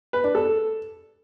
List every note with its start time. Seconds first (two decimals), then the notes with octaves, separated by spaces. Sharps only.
0.13 B4
0.24 D4
0.35 A4